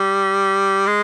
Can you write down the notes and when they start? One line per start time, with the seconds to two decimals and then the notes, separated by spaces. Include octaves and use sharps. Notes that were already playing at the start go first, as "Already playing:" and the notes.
Already playing: G3
0.87 G#3